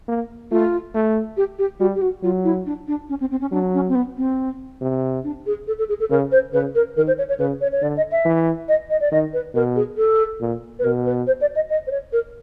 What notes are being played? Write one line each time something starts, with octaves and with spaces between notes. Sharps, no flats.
A#3
A3 F4
A3
G4
G4
G3 F#4
G4
F#4
F#3 F4
E4
D4
D4
C#4
C4
C4
C#4
F#3 D4
C#4
C4
B3
C4
C3
D4
G#4
A4
A4
G#4
A4
C#3 A#4
C5
C#3 B4
A#4
D#3 A#4
C5
C#5
C#5
C#3 B4
C#5
C#5
D3 D5
D#5
E5
E3
D#5
D#5
D5
D#3 D#5
B4
B2 A#4
G#4
A4
A#2
B4
B2 A#4
B4
C5
D5
D#5
D#5
C5
C#5
A#4